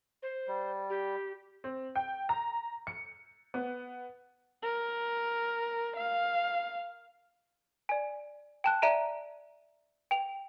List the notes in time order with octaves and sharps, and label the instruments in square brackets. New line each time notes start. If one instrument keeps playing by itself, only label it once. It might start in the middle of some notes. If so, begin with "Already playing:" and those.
[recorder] C5
[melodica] G3
[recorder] G4
[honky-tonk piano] C4
G5
A#5
C#7
B3
[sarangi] A#4
F5
[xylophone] D5 G#5
G5 A5 F#6
D5 E5 A#5 D7 D#7
G5 F7